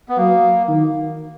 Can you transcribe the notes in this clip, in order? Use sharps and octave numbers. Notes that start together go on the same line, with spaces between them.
B3
F#3 A#3
D#3